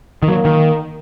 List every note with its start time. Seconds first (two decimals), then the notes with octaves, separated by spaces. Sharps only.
0.22 D#3
0.27 F#3 A#3
0.45 D#3